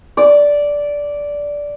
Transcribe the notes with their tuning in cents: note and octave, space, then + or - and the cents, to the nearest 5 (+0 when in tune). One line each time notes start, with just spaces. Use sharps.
D5 -10